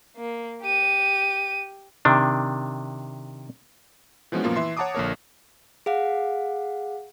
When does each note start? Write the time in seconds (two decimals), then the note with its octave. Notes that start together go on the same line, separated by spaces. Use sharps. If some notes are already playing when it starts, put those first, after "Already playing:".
0.17 A#3
0.62 G4 D#7
2.05 C3 D#3 D4
4.32 E3 F3 G#3 B3 C#4 F#4
4.44 F#2 A#2 F3 A#3 B3 F4
4.56 E3 E5 C6 C7
4.77 C#5 F#5 A5 A#5 D6 D#6
4.95 A#1 D3 A#3 A#4 C#5
5.86 G#4 F5 F#5